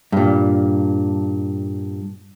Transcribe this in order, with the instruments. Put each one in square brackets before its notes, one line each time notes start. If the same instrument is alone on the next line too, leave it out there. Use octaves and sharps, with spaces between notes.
[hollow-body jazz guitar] G2 A#2